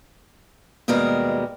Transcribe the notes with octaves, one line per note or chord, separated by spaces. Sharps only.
D#2 B2 G3 G#3 A#4